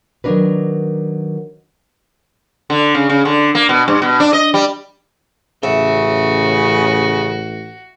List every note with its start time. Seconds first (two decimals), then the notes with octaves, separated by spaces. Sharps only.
0.24 D#3 F#3 G#3 D4 A#4 B4
2.70 D3
2.95 C#3
3.10 C#3
3.25 D3
3.55 A#3
3.69 B2
3.88 G2
4.02 B2
4.20 D4
4.33 D#5
4.54 G3
5.63 A1 C#3 F#4 E5